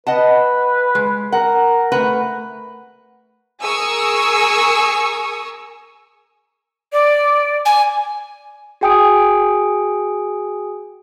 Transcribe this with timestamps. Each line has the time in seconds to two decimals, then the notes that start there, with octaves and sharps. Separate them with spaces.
0.07 B4 D#5 F#5 A5
0.95 G#3
1.32 A#4 F#5
1.92 A3 A#4 B4 F#5
3.62 G#4 A#4 G#5 C#6 D#6 E6
6.93 D5
7.65 G#5
8.81 F#4 G#4 G5 G#5 D#6 D7